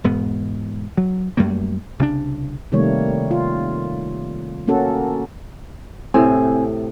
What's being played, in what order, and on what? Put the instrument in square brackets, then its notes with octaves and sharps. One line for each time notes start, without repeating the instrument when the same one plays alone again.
[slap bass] E1 G#2 B3
F#3
F#2 G3 A3 A#3
C2 C#3 C#4 D4
[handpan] C3 D#3 G3 A3 A#3 C#5
F4
A#3 C#4 F#4 A4
[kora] A2 C3 [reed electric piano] C4 G#5